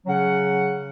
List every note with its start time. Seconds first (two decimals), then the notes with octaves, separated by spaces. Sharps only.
0.06 C#3 F#3 C#4 F#5